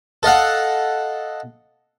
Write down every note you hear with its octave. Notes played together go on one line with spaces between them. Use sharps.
A4 D#5 F5 F#5